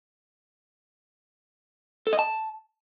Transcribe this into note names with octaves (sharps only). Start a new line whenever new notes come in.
A4
D#5
A5